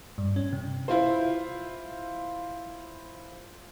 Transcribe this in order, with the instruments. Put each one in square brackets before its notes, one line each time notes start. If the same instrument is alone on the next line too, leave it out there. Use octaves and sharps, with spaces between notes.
[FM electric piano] G2
C#4
C3
[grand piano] E4 F4 C5